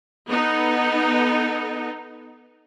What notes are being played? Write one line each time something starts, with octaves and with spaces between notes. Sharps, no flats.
B3 D#4 A4